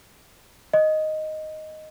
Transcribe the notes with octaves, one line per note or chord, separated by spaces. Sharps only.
D#5